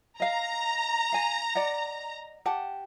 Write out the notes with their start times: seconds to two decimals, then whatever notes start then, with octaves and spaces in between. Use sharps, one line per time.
0.20 D#5 F5 A#5
1.12 F5 G#5
1.55 D5 D#5 F#5
2.46 G4 F#5 A5